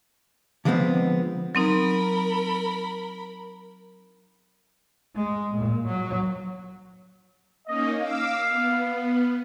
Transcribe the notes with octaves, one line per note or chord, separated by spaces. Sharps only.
D3 F3 G#3 B3 C4
F#3 C4 D#4 A#4 B5
G#3
A#2
F#3
A#3 C#4 D#4 D#5
F5 D6 E6
B3